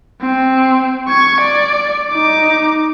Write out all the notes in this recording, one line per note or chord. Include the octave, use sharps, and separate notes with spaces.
C4
C#6 G#6
D5
D#4 D6